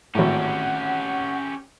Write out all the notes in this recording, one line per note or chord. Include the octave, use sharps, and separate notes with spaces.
G#1 A2 C#4 G4 F#5